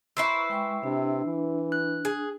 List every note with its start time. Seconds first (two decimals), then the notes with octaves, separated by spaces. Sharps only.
0.17 E4 B4 C5 E5 A#5 C#6 E6 C7
0.49 G#3 G5 C#6
0.83 C3 D4
1.25 E3
1.72 F#6
2.05 G#4